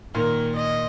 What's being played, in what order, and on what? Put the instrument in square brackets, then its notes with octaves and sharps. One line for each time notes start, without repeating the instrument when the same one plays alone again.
[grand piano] A#2 D#3 [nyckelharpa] A#4
[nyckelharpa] D#5